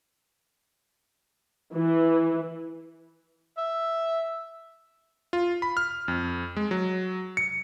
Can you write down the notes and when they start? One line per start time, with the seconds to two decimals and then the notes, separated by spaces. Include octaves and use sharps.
1.74 E3
3.57 E5
5.33 F4
5.62 B5
5.77 F6
6.08 F2
6.57 G#3
6.71 F#3
7.37 C#7